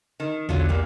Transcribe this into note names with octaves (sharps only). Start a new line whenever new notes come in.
D#3
B1 E2 D3 F#3 F4
A#2 G3 A#3